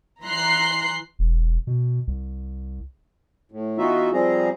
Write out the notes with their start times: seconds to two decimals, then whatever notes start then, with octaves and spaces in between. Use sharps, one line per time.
0.23 E3 A#5 C6 F#6 C7
1.19 E1
1.67 B2
2.07 C2
3.52 A2
3.78 E3 B3 D#4 F4 F#4 E5
4.13 F3 G3 C4 G#4 A#5